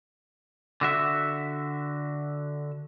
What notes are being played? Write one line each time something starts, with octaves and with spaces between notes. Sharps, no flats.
D3 F#4 E5